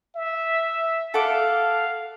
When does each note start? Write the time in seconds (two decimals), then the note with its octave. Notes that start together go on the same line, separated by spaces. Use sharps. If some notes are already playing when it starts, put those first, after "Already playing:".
0.16 E5
1.14 A4 F5 F#5 D6